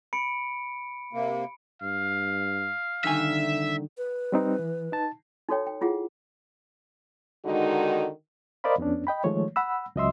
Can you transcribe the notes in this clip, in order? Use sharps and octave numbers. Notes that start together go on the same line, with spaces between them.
B5 C#7 D7
C3 A#3
G2 F5
C2 D3 D#3 E5 G#5
B4
G3 C4 D#4
E3
D#4 A5
D#4 F#4 A4 C#5 G5
G5
E4 F4 G#4 F#5
D3 D#3 G#3 D#4 F#4
A#4 C5 D5 D#5 F5 B5
F2 B3 C#4 D4
D#5 G5 B5
D#3 F3 G#3 A3 C#5
F#5 B5 E6
C#2 F#3 D#5 E5 C6 E6